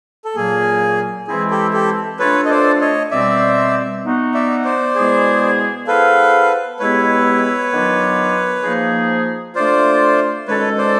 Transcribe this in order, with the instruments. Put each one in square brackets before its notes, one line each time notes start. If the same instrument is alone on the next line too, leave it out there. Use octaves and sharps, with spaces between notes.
[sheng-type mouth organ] A4
[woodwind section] A#2 F#3 A#3 [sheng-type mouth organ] G#4
[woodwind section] E3 G#3 C4 E4 [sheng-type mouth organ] G#4
[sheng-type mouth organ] G4 A4
G4 A4
[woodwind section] A3 D4 F4 A4 [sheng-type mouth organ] B4 C#5
[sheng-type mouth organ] D#5
C5 D5
C#5 D#5
[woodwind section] B2 G3 C4 [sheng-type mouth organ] D5 E5
[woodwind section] B3 D#4 F#4
[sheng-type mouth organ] D5 E5
C5 D5
[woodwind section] B2 G#3 B3 E4 G#4
[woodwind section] B3 E4 G#4 C5 F5 [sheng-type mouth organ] A4 B4
[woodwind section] G#3 B3 E4 G4 [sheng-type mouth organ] B4 C#5
[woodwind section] D#3 F#3 B3 D4 F4
F3 A#3 D#4 G#4
[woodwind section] A3 D4 F4 [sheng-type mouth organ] C5 D5
[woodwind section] D#3 G#3 C#4 F#4 A4 [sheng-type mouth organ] B4 C#5
[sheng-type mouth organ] C5 D5